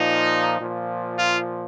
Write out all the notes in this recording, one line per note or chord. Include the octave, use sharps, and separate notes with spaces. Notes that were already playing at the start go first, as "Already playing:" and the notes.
Already playing: A#2 F3 D#4
A#2 F3
F4